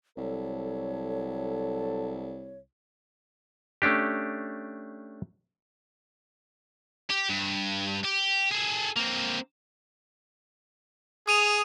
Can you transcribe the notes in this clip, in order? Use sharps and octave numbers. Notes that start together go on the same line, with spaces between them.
C2 F#3 A4 C#5
A3 C#4 D4 G4
G4
G2
G4
G#4 A4
A#3 C4
G#4 D#6 D#7 F7